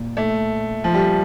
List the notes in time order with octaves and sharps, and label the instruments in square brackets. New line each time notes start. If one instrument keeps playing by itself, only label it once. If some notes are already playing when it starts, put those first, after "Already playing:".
Already playing: [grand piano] A#2
[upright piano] A3
F3
G3